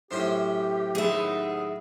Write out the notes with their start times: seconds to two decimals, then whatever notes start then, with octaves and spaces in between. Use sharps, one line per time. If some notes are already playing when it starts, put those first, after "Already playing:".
0.11 F#2 A2 C#4 G4 C5
0.95 D#2 B3 D#4 G#4 E5